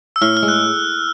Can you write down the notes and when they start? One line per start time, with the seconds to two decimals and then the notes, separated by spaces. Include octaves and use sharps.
0.16 E6
0.21 A2 F6
0.37 F6
0.42 G#3
0.48 F#6